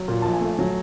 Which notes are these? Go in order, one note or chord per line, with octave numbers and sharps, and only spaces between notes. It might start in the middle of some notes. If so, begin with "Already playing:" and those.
Already playing: F#3
A#2
A#1 A5
G#5
A3
F#3